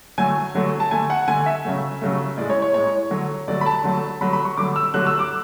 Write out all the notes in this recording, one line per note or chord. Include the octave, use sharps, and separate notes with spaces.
D3 F#3 A3 G#5
D3 F#3 A3
A5
D3 A3 G#5
F#5
D3 A3 G#5
E5
C#3 F#3 A3
C#3 F#3 A3
A2 G#3 D5
C#5
C#5
A2 G#3 C#5
D3 F#3 A3
D3 F#3 A3 D5
B5
A5
D3 F#3 A3
D3 F#3 A3 B5
B5
C#6
D3 F#3 A3 D6
E6
D3 F#3 A3 F#6
E6
D6